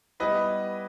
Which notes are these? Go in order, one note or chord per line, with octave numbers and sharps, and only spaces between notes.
G3 B3 E4 B4 D#5